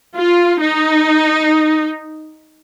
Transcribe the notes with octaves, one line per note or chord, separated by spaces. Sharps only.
F4
D#4